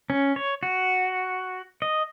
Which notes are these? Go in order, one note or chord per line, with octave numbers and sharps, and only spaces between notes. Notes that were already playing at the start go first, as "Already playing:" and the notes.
C#4
C#5
F#4
D#5